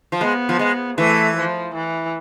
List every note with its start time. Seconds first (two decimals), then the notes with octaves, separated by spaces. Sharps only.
0.12 F3
0.21 G#3 B3
0.49 F3
0.59 G#3
0.98 E3 A3
1.37 F3
1.74 E3